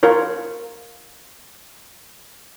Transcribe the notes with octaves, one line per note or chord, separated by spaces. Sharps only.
F4 A#4 C#5